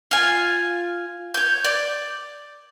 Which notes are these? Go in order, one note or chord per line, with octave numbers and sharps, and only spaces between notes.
F4 G#5
C#5 G6
D5